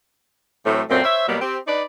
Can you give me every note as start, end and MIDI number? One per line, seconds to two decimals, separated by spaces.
0.65 0.82 45
0.65 0.82 52
0.65 0.82 54
0.65 0.82 57
0.65 0.82 60
0.90 1.01 42
0.90 1.01 46
0.90 1.01 57
0.90 1.01 60
1.04 1.27 72
1.04 1.27 73
1.04 1.27 76
1.28 1.37 47
1.28 1.37 54
1.28 1.37 55
1.28 1.37 58
1.28 1.37 59
1.41 1.58 60
1.41 1.58 67
1.67 1.83 63
1.67 1.83 71
1.67 1.83 74